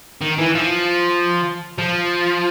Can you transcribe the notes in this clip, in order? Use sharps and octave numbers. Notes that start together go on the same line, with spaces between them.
D#3
E3
F3
F3